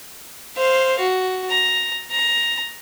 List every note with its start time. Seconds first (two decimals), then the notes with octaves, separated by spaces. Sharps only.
0.57 C5 F5
0.99 F#4
1.50 A#5
2.11 A#5